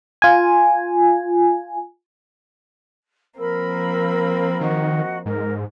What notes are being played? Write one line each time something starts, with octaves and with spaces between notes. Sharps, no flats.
F4 G#5
F3 A#3 C4 A#4 B5 E6
D#3 F#4 D#5
G#2 A#4